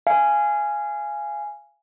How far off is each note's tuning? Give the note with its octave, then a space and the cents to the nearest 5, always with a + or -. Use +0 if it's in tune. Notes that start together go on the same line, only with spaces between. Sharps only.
F5 -25 G#5 +0